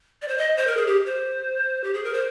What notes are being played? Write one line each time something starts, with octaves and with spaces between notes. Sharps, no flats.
D5
C5
D#5
C5
A#4
G#4
G4
C5
G4
G#4
A#4
C5